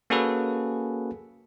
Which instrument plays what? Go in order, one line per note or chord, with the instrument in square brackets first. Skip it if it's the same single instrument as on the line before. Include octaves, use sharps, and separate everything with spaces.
[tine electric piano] A#3 C#4 F#4 G#4 A4 B4